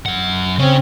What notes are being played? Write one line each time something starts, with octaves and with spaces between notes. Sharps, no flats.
F#2 F#5
C#3 C4 C#4